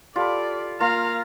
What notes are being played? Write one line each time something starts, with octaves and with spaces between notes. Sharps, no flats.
F4 G4 A4 D5 B5
A#3 F4 F5 A#5